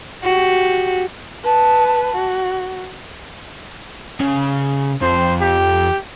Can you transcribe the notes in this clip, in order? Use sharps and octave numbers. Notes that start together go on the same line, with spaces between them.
F#4 G4
B4 A5
F#4
C#3
F2 C5
G4